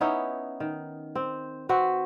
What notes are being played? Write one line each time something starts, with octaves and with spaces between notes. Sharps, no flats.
B3 C#4 D#4 E4
D#3
C4
C4 F#4 B4